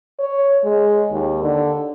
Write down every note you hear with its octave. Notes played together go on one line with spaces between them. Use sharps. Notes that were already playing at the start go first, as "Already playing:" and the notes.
C#5
G#3
D#2
D3